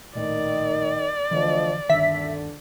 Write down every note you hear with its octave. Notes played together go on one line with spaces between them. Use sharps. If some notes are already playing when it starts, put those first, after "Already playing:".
A#1 A2 D#3 D5 D#5
D2 D3 E3 F3 D#5
G1 D2 D3 D#3 E5 B6